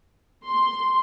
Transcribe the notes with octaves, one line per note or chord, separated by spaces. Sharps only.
C6